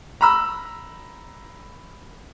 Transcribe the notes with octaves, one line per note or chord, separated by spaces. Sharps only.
A#5 B5 E6